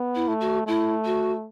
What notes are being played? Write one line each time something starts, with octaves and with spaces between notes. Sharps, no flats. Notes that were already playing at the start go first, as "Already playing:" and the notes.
Already playing: B3
E4
A3
F#4
A3 E4
F#4